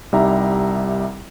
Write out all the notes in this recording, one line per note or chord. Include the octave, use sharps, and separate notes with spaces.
C2 G3 D#4 E5 A#5